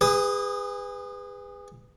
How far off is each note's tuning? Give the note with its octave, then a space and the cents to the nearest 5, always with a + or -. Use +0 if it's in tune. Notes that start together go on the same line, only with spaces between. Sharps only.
G#4 -30 B4 +15 D#6 +10